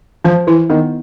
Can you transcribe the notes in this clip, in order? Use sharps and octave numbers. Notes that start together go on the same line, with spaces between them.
F3 C5
E3 E4
D#3 B3